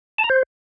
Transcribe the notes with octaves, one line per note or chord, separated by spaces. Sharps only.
A5
A#5
C5